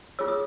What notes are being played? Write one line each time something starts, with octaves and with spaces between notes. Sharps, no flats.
F4 G#4 C#5 E6
D#6